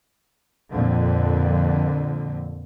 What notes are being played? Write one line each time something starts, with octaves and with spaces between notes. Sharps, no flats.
F2 A#2 D3